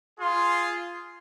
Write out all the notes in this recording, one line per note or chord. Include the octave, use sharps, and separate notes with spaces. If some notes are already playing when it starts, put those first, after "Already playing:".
F4 G#4 C6